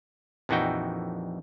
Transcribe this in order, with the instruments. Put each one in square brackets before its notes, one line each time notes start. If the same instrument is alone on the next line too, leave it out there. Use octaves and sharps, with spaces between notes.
[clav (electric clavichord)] A#1 F2 E3 D#4 F#4 G5